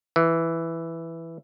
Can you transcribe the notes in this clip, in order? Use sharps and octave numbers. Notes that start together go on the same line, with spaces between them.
E3